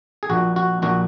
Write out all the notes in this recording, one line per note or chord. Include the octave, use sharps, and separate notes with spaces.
G#4
A#1 A#2 F#4
F#4
A#1 A#2 F#4